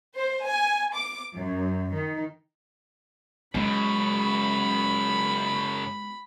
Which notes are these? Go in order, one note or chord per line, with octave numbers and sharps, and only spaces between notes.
C5
G#5
D6
F#2
D#3
F#2 C#3 G#3 B5